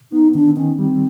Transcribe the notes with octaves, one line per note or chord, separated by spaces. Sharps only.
B3 D#4
D#3 D4
D#3 C#4
G3 C4